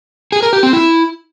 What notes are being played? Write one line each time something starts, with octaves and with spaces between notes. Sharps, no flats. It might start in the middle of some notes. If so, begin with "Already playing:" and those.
G#4
A#4
G4
C4
E4